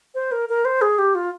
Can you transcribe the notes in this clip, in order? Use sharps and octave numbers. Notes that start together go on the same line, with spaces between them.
C5
A#4
A#4
C5
G#4
G4
F4